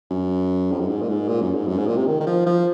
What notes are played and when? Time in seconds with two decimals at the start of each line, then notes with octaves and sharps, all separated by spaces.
0.10 F#2
0.71 F2
0.80 F#2
0.89 G#2
1.01 A#2
1.09 G#2
1.28 A#2
1.41 F#2
1.54 G#2
1.68 F#2
1.78 G#2
1.87 A#2
1.97 C3
2.07 D#3
2.20 D#3
2.26 F3
2.46 F3